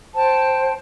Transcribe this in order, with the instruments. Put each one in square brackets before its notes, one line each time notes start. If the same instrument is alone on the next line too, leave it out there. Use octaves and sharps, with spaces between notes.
[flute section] C5 G5 A5